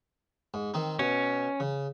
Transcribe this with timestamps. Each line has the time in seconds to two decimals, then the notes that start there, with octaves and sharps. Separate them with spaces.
0.54 G#2
0.74 D#3 C4 D#4
0.99 B2 C#4
1.60 C#3